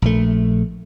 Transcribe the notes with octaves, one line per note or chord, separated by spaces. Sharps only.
A#1 A3